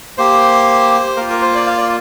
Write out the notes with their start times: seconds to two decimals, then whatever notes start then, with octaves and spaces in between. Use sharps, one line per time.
0.18 A#3 G4 C5
1.17 A#3 F4 A#4
1.30 A#4
1.42 C5
1.55 D5
1.67 F5
1.78 D5